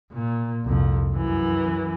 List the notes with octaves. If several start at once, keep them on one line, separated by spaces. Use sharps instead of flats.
A#2
C2 F2
F#2 E3